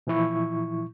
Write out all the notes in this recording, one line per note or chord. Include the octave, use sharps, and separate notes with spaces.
A#2 E3 F3 E4 C#6